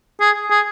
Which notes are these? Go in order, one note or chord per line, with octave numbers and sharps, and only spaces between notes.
G#4
G#4